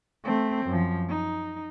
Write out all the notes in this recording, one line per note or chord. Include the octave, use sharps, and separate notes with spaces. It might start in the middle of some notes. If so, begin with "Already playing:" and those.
A3 C4
F#2 F3
D#4